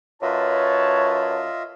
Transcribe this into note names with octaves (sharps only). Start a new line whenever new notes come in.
F#2 F4 B4 C#5 D#5 E5 A5